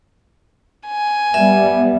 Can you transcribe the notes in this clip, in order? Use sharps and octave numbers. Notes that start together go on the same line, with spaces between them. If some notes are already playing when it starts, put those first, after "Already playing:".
G#5
G3 B3 E5